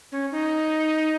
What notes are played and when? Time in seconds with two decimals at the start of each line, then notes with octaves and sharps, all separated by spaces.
0.12 C#4
0.31 D#4